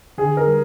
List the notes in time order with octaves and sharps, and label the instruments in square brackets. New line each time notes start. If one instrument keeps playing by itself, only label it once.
[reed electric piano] D3 [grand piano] G#4
[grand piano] A#4
[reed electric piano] G3